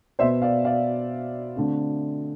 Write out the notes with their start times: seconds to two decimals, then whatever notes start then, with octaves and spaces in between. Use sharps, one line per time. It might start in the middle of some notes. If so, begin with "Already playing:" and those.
0.19 B2 B3 C5 E5
0.42 D5 F5
0.64 D5 F5
1.56 D3 A3 C4